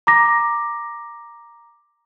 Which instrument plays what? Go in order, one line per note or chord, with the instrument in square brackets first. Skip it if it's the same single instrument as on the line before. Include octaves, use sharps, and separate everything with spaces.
[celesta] A#5 D6 A#6